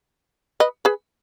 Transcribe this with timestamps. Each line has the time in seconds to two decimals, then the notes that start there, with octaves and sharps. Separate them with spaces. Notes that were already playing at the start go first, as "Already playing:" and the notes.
0.60 B4 D#5
0.85 G#4 B4